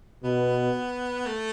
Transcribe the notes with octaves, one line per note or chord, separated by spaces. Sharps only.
B2 B3
A3